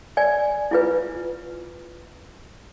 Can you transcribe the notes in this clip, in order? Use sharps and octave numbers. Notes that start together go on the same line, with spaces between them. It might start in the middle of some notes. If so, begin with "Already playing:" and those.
D5 G#5
E4 F4 B4